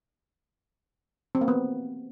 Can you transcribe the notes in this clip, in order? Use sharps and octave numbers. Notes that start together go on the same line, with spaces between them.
C4
A#3
B3